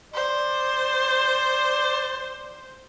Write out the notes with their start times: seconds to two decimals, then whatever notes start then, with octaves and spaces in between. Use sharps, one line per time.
0.14 C5 D5